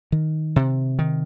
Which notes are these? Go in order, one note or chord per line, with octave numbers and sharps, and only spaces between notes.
D#3
C3
D#3